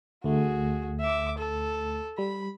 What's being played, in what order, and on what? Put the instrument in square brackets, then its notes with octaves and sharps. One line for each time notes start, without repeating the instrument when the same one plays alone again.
[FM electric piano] D2 A3 [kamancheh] F#4 G#4
[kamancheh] E5 D6
A4
[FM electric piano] G3 [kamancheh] B5